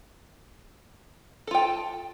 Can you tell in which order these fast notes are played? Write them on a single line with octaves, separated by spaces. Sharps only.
A4 F4 G5 A5